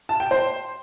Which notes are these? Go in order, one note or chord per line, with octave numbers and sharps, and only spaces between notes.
A5
G5
C5